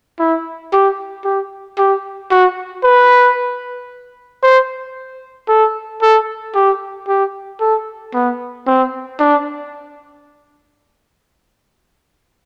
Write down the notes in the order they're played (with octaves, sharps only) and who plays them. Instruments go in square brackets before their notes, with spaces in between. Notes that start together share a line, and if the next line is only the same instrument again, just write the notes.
[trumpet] E4
G4
G4
G4
F#4
B4
C5
A4
A4
G4
G4
A4
B3
C4
D4